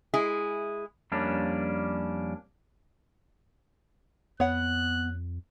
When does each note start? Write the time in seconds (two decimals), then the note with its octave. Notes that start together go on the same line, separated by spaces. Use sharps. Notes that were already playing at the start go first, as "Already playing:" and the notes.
0.14 G#3 E4 G#4
1.12 F2 G3 A#3 C#4 D4
4.40 F2 B3 C#5 F#5 F#6